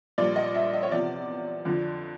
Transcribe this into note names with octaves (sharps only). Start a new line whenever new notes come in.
A#1 A#2 G3 D5
D#5
E5
D#5
C#5
E2 C3 F3 D5
F2 D3 F3